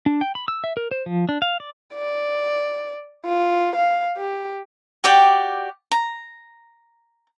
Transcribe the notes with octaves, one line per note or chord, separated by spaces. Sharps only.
D4
G5
B5
E6
E5
A#4
C5
F3
D4
F5
D5
D5
F4
F5
G4
F#4 G4 D5 G5
A#5